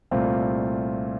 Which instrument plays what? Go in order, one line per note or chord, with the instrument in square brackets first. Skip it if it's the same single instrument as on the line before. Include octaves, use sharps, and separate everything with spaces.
[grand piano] C2 A#2 A3 C4 F4